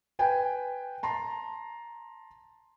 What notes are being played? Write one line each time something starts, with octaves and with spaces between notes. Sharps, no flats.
B4 G5 G#5
A5 A#5 C6